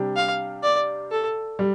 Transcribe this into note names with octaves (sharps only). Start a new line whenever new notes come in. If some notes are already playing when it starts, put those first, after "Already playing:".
Already playing: C3 G3 D4 G4
F5
D5
A4
G3